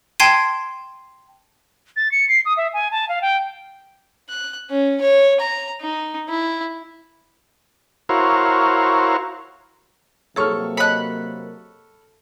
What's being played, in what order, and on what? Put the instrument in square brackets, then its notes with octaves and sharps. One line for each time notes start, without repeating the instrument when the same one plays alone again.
[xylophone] G5 A5 C6 G#6 C7 D#7
[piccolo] A6
C#7
C7
D#6
E5
G#5
A5
F5
G5
[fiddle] F#6
C#4
C#5
A#5
D#4
E4
[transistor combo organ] E4 F#4 A#4 C5 C#5 F5
[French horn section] C3 F#3 A#3 [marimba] G#4 C#5 [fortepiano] A4 C#6 F6
[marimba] C#5 D#5 A5 [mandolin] B5 F#6